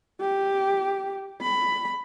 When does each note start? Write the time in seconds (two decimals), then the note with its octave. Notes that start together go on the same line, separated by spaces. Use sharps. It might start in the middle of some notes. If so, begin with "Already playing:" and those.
0.21 G4
1.42 B5